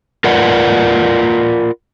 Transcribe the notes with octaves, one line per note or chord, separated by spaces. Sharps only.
F4 A#4 B4 D5 F#5